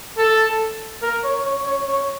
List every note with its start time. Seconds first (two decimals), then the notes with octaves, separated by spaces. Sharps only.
0.18 A4
1.02 A#4
1.24 C#5
1.45 C#5
1.65 C#5
1.87 C#5